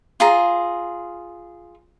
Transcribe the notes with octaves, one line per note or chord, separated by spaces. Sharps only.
F4 G#4 A#5